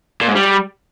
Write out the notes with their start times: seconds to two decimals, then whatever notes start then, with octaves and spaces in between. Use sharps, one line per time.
0.21 A#2
0.28 G#2
0.35 G3